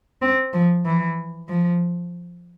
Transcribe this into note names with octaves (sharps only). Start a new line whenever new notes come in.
C4
F3
E3
F3